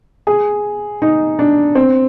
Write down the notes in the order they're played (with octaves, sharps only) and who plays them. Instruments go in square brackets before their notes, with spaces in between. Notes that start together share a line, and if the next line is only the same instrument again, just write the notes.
[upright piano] G#4
D#4
D4
C4